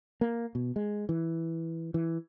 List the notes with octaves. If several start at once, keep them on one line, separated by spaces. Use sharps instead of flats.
A#3
B2
G#3
E3
E3